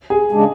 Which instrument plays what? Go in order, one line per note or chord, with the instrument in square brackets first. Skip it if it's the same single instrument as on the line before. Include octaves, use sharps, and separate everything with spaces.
[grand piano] G#4
[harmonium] C#3 G#3 D4